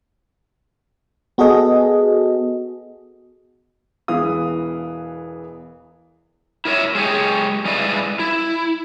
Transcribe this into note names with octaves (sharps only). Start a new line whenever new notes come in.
B3 F#4 G#4 A4 D#5
E1 E3 B3 F5 D#6
E4 A#4 C#5 E5
G#3 G4 G#4 C#5
G3 G#3 E4 B4 D5 F5
E4